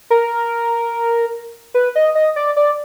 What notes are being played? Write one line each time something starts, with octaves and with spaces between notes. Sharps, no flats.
A#4
B4
D#5
D#5
D5
D5